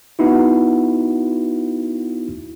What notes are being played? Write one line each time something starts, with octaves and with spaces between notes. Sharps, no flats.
B3 D#4 E4 F#4